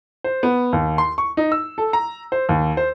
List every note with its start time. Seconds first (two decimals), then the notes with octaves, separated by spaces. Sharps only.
0.24 C5
0.43 B3
0.73 D#2
0.98 C6
1.18 C#6
1.37 D#4
1.52 E6
1.78 A4
1.93 A#5
2.32 C5
2.49 D#2
2.77 C5